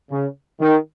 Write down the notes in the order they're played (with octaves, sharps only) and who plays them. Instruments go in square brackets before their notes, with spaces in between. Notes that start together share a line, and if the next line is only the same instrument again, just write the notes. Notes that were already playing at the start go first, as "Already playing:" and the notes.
[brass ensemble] C#3
D#3